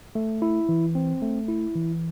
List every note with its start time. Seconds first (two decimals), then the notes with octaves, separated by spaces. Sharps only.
0.15 A3
0.42 E4
0.69 E3
0.95 C4
1.22 A3
1.48 E4
1.75 E3